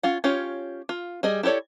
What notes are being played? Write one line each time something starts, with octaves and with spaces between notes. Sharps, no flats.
C#4 F4 F#5
C#4 F4 G4 C#5
F4
G3 G#4 D#5
E4 G4 A4 C#5 D5